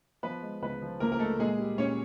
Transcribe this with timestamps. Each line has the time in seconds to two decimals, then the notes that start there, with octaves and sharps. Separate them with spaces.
0.23 F3 B3 B4
0.42 G#3
0.62 C#2 B3 B4
0.82 F3
1.00 C#2 A#3 A#4
1.12 A#4
1.19 G#3 A3 A4
1.39 A#2 G#3 G#4
1.59 G3
1.78 A#2 C#4 C#5